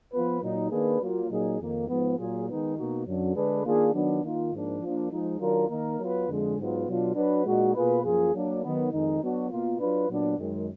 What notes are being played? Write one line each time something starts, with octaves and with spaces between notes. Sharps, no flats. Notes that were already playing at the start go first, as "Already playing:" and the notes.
F3 B3 F4 B4
A#2 F#3 A#3 D#4
D#3 A#3 D4 G#4 B4
F#3 A#3 F4
A#2 F#3 A#3 D#4 G#4
F2 D#3 A#3
G#2 F3 B3
A#2 F#3 A#3 F4 G#4
D#3 G#3 B3 D#4
B2 A#3 D#4 F#4
F#2 D3 F#3
D3 G#3 D4 G#4 B4
D#3 A#3 D4 F4 G#4
D#3 F#3 B3 D4
D#3 A#3 F4
G#2 F3 A#3 D4
F3 A#3 D4
F3 G#3 D#4
D#3 F#3 D4 F4 A#4
D#3 A#3 D#4 A#4
F#3 B3 F4 B4
F2 D3 F3 G#3
G#2 F#3 B3 F4
B2 F#3 D4 F4
F#3 D4 F#4 B4
A#2 G#3 D#4 F#4
B2 A#3 F4 G#4 B4
F#2 F3 A#3 F4 G#4
F#3 A#3 D4
D#3 F#3 B3
F2 D#3 G#3 D#4
F#3 B3 D4 F#4
B2 A#3 F4
F#3 D4 F4 B4
A#2 F#3 B3 D4
F#2 D#3 G#3